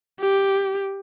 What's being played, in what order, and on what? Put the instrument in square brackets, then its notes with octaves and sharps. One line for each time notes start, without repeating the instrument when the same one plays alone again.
[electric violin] G4